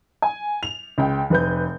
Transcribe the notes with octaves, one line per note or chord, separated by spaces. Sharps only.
G#5
F7
C#2 G5
F1 B4 G6